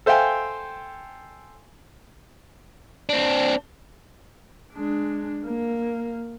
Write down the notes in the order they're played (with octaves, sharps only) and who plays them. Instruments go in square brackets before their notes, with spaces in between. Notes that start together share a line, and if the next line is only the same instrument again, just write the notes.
[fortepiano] A4 C5 E5 F5 G5 G#5
[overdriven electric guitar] C4 D4
[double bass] G#3 D4
A#3